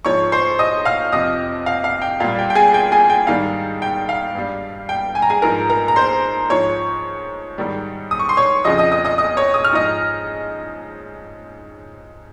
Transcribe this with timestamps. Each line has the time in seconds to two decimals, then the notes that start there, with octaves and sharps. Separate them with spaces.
0.05 G#2 F3 C#5 C#6
0.32 C5 C6
0.59 D#5 D#6
0.85 F5 F6
1.12 F2 C3 F3 D#5 D#6
1.66 F5
1.84 F5
2.02 G5
2.20 A#2 G3 F5
2.39 G5
2.50 G5
2.55 G#4 G#5
2.74 G5
2.92 G#4 G#5
3.10 G5
3.27 G#2 D#3 G3 F5
3.82 G5
4.09 F5
4.35 G2 G3
4.89 G5
5.15 G#5
5.22 A#5
5.30 G#4 G#5
5.42 G#2 F3 A#4 A#5
5.70 A#4 A#5
5.88 A#5
5.96 C5 C6
6.50 G#2 F3 C#5 C#6
7.58 G#2 D#3 G3
8.11 D#6
8.19 C#6
8.29 C6
8.37 C#5 C#6
8.64 F2 C#3 F3 D#5 D#6
8.78 D#5 D#6
8.92 D#5 D#6
9.05 D#5 D#6
9.18 D#5 D#6
9.37 C#5 C#6
9.54 D#6
9.65 F6
9.72 G#2 F3 D#5 D#6